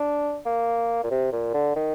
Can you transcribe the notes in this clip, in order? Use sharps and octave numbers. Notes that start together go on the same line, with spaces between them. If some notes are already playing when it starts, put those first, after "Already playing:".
Already playing: D4
A#3
A#2
C3
A#2
D3
D#3